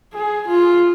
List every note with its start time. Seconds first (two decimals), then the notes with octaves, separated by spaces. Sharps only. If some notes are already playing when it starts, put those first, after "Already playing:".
0.14 G#4
0.47 F4